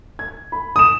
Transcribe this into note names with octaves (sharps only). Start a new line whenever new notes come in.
G#6
B5
D#6 E7